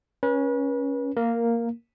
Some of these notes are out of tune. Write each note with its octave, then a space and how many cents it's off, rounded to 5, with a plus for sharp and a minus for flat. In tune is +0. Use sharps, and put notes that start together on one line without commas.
C#4 +0 B4 -40
A#3 -5 A#4 +0